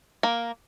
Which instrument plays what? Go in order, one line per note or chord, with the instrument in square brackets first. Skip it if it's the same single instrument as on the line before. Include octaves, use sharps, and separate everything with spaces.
[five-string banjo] A#3